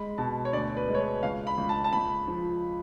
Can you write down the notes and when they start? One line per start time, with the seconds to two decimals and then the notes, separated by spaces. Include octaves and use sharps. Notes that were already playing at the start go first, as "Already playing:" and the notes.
Already playing: G#3 B5
0.18 B2 A5
0.45 C#5
0.53 D2 D5
0.77 B4
0.88 G#3
0.95 C#5
1.00 B4
1.23 C#2 F5
1.47 B5
1.58 C#2
1.69 A5
1.84 A5
1.93 C#2 B5
2.28 F3